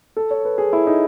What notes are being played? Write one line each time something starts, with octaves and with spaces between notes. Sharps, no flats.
A4
C#5
B4
G#4
E4
D#4